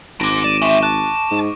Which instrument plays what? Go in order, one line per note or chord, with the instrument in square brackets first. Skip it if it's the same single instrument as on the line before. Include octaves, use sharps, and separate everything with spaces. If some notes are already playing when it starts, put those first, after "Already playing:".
[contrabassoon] G#1 [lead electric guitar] D#2 G#2 [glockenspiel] D6 A#6 D7
[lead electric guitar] D5 [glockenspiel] D#7 E7
[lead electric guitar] G#3 C4 [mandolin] E5 A5 [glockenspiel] C#6
[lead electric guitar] A5 [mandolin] F#6
[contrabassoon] G#2